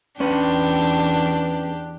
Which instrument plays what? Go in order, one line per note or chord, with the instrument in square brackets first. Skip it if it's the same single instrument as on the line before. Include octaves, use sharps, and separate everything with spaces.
[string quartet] E2 D4 G4 [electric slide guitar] C#4 B4